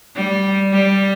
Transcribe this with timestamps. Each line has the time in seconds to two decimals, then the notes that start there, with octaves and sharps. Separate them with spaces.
0.16 G3
0.72 G3